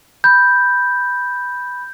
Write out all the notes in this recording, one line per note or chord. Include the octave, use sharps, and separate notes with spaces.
B5 G6